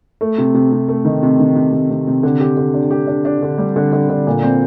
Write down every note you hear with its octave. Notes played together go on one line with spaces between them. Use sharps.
A3
C3
C3
C3
A3
D#3
C3
D#3
C3
C3
C3
C3
D3
G4
D3
D4
G4
D4
D4
D3
G3
D3
D3
D3
A#2
C4